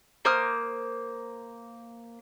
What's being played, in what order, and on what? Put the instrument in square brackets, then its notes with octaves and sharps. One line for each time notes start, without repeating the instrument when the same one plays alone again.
[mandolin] A#3 C5 D#6 F6